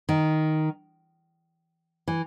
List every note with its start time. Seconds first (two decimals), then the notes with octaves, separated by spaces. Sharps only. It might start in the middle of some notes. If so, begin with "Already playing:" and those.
0.09 D#3
2.08 E3